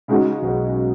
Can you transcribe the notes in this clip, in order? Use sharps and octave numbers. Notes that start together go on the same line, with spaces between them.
C#3 G#3 D#4 F#4
B1 B2